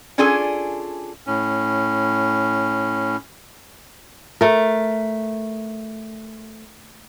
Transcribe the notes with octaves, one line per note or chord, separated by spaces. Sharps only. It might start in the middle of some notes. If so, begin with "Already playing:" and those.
C#4 D4 F4 G#4 A4 G#5
A2 C#4
A3 A#4